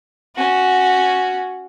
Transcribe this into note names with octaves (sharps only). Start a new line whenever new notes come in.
C#4 F#4